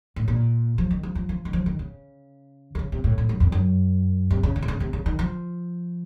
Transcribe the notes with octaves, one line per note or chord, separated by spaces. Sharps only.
A2
A#2
F3
D#3
F3
F3
F3
D#3
F3
D#3
C#3
D#3
C#3
C3
A2
A2
F#2
F2
F#2
C3
C#3
C#3
C3
C#3
C3
C#3
D#3
F3